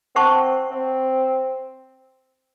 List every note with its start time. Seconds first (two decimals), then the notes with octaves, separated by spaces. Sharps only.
0.15 C4 C5 F#5 A5 C#6
0.71 C4